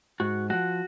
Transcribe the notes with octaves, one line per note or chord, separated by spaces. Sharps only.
G#2 F#4
F3 G#3 F#4